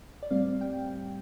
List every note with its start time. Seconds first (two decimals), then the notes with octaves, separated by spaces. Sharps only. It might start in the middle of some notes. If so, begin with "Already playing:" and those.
0.23 D5
0.31 A2 G3 C4 F5
0.61 G5